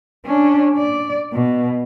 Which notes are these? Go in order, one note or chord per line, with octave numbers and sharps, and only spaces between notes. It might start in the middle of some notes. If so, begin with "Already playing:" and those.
C#4 D4
D5
B2